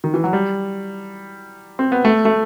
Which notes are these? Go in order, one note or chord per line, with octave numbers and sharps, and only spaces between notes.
D#3
E3
F#3
G3
C4
B3
A3
A3